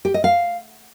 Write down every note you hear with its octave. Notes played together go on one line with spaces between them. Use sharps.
G4
D#5
F5